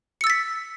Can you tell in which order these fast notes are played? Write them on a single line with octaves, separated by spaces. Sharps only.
C#7 E6 A6 B6